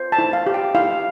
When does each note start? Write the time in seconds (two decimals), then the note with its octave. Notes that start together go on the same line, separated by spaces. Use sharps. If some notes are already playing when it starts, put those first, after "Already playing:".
Already playing: C5
0.12 A5
0.19 E4
0.33 F5
0.47 G4
0.54 G5
0.75 E4 F5